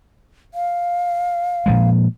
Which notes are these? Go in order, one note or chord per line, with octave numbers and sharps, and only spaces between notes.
F5
A#2 F3 G#3